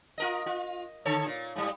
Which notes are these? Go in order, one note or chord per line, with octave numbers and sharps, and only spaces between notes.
F4 A#4 D#5
F4
D3 A4 C#5
A#2
G#2 G3